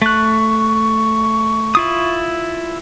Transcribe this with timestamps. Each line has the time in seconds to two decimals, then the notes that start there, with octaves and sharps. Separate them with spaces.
0.02 A3 C#6 F#6
1.75 E4 F4 D#6